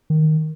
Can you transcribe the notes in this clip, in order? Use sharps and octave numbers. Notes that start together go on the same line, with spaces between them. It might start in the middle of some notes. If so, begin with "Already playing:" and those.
D#3